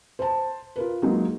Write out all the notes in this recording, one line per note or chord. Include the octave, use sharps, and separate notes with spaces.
C5 A5
F4 A#4 B4
F#3 G#3 A#3 D#4